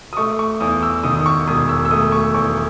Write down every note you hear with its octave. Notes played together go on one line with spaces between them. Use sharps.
D#6
A3 C#6
C#6
E2 D#6
E6
D#3 D#6
D#6
C#6
E1 D#6
E6
E6
A3 D#6
C#6
E2 C#6